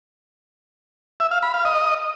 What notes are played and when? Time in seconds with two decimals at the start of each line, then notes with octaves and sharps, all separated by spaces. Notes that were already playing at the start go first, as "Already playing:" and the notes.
1.20 E5
1.31 F5
1.43 B5
1.54 F5
1.65 D#5